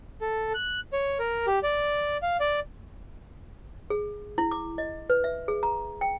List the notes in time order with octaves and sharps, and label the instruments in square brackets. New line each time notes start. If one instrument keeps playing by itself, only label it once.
[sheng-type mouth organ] A4
F#6
C#5
A#4
G4
D5
F5
D5
[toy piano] G#4
E4
D6
D#5
B4
E5
G#4
A#5
G5